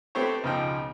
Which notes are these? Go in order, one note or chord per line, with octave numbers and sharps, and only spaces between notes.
A3 B3 C4 G4 C5 C#5
C#2 B2 F3 D#4 G5